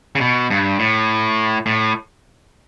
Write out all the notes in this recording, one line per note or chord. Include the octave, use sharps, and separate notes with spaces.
C#3
B2
G2
A2
A2